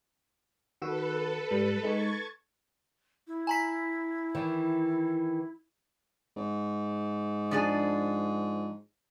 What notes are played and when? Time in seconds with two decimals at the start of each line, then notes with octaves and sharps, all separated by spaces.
0.82 D#3 F#4 A4 B4 E6
1.51 G#2 G3
1.83 G#3 D#4 C#6 G#6 A6
3.27 E4
3.47 G#5 A#5 B6
4.35 D#3 E3
6.37 G#2
7.51 F3 D4 G#4